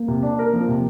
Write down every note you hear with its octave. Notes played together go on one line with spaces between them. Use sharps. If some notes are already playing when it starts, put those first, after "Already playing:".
Already playing: A#3
C3
D4
A#4
F3 A#3
C3